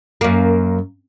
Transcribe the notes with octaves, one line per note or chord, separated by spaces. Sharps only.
F#2 A#3